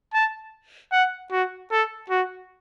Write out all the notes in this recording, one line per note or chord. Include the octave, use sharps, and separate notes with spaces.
A5
F#5
F#4
A4
F#4